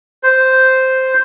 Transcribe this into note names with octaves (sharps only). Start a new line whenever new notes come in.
C5